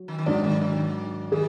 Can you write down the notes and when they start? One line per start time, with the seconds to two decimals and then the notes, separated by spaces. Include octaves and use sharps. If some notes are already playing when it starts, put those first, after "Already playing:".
Already playing: F#3
0.08 D#3
0.18 D#3
0.26 G#2 D3 F#3 D4 F#4 D5
0.44 D#3
0.62 D#3
1.32 D#3 G#4